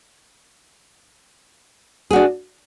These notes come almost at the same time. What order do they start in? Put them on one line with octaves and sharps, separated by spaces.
G#4 F#4 D4